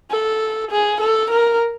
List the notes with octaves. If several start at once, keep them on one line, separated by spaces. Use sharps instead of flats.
A4
G#4
A4
A#4